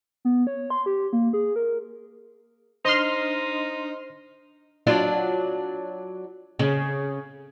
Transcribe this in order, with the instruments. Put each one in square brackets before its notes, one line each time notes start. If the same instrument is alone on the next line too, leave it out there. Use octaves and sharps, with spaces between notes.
[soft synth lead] B3
C#5
C6
G4
A#3
G#4
A#4
[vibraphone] D4 [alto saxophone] D#4 [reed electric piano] C5 [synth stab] D#5 C6 F6
[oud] F#3 D4 F4
C#3